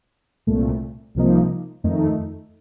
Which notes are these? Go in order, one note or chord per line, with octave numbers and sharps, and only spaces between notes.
C2 A#2 A3
C2 C3 F3 A#3 D#4
F2 D#3 A3 D#4